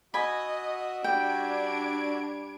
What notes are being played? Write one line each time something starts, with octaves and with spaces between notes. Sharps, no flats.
F#4 D#5 E5 F#5 G#5 B5
G3 D4 G5 G#6 D7